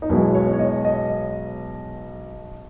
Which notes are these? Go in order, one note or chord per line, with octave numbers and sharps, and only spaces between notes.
D#4
B1 B2 G#3 E4
C#5
C#5
D#5
D#5